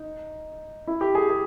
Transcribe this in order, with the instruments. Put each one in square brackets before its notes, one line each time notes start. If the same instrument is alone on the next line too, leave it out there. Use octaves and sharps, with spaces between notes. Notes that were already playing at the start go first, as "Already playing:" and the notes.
Already playing: [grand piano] D#4
E4
G4
G#4
G#4